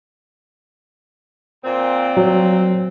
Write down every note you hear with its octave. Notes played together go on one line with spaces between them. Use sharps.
A#2 C4
F#3